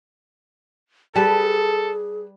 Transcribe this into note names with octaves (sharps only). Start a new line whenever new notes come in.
G3 G#4 A4 B4 A5